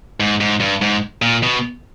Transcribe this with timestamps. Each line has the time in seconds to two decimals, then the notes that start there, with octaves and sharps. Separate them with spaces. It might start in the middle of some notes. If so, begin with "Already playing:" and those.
0.20 G#2
0.40 G#2
0.60 G2
0.82 G#2
1.22 A#2
1.43 B2